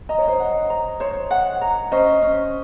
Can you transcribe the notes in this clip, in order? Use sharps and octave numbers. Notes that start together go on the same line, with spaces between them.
D#5 A#5
C#5
C5 D#5
F#5
A#5
C5 C#5
F#5
A#5
C#4 C5 D#5
C#4